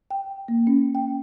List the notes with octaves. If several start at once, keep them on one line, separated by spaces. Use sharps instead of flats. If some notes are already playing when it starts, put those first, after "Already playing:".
G5
A#3
C#4
G5